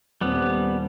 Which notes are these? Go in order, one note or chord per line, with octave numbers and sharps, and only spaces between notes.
D#1 G3 B3 C4